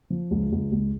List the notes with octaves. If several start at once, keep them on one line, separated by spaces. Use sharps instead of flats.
F3
C#2
C#2
C#2